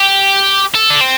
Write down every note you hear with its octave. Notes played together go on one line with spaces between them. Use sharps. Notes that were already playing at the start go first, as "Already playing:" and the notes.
Already playing: G4
A4
D4
C4